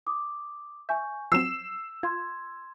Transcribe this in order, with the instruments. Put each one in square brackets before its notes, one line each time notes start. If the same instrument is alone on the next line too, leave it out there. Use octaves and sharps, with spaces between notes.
[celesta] D6 D#6
[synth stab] E5 [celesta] G#5 C#6 G6
[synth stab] F3 F#3 C4 [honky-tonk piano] E6 E7 [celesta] C7
[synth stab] F4 [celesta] C6 G#6